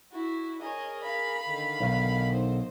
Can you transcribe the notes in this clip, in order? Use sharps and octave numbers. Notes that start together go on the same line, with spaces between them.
E4 F#4
G#4 A#4 C#5 D#5
F5 B5
D3 D#3
B1
D#4 C5